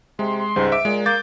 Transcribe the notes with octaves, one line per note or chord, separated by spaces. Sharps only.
C3 G#3 C6
C6
C#2 G#2 G3
E5 D6 D7
A#2 G#3
A#3 D6 G6 A6